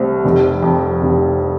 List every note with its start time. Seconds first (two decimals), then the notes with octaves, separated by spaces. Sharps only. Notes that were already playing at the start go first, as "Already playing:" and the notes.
Already playing: C2 A3 C4
0.25 F1
0.63 F2
1.02 F1